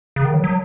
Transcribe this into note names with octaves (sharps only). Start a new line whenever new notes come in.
C#3
D#3
F#3
F#3